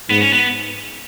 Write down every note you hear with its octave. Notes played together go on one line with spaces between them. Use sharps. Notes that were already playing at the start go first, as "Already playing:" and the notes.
G#2 B3
C#4
B3